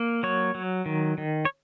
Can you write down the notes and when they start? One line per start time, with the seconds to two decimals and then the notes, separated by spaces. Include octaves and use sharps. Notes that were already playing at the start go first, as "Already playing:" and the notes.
Already playing: A#3
0.23 F#3 C#5
0.55 F#3
0.86 D#3
1.18 D#3
1.45 C#5